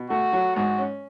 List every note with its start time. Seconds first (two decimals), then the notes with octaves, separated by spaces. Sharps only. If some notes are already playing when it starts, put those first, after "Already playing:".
Already playing: B2
0.10 A3 F#4
0.33 F#3
0.56 G#2 F#4
0.78 C#4